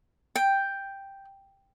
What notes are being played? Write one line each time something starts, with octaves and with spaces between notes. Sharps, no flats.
G5